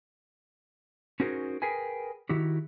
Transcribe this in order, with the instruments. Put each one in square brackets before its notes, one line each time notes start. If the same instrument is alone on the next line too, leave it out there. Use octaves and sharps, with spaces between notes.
[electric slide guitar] C#4 D#4 F#4 G#4 A#4 C5
G#4 A#4 B4 G5 G#5
D#3 E4 F#4 G4